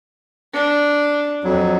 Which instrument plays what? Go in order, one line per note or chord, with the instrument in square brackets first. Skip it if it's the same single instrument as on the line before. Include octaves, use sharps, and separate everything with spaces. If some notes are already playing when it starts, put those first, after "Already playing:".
[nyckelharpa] D4
[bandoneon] F2 F#3